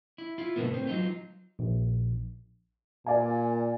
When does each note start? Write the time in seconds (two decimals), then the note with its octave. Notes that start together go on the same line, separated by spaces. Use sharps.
0.18 E4
0.38 E4 F4
0.56 G#2 B2 D3 D#3 A#3 B3
0.74 A2 C4
0.87 F#3 D#4 F4
1.59 A#1
3.06 A#2 D5 F5 G#5